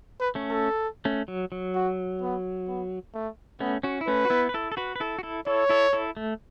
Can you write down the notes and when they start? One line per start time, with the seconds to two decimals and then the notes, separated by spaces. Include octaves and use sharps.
0.20 B4
0.35 A3 C#4
0.51 A4
1.05 A3 C#4
1.28 F#3
1.52 F#3
1.75 F#4
2.21 B3
2.68 B3
3.14 A3
3.60 A3 B3 C#4
3.83 C#4 F#4
4.01 E4
4.07 A3 C#4 B4
4.25 F#4
4.30 B3 E4
4.49 B4
4.54 E4 A4
4.72 A4
4.77 F#4 B4
4.96 B4
5.00 E4 A4
5.19 F#4
5.23 E4 A4
5.46 E4 A4 C#5
5.69 E4 A4
5.93 E4 A4
6.17 A3